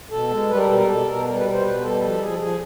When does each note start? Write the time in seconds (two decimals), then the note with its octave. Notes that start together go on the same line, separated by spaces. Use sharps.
0.11 B2 A4
0.30 G#3
0.49 G3 B4
0.57 A#4
0.66 B2 A4
0.74 A#4
0.87 B2 A4
1.06 B2 A#4
1.26 G3 A#4
1.35 B4
1.44 B2
1.53 C5
1.63 B2 B4
1.82 G3 A4
2.01 F3 A4
2.20 F3 G#4
2.39 F3 G#4